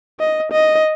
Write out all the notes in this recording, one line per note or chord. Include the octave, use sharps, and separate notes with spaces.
D#5
D#5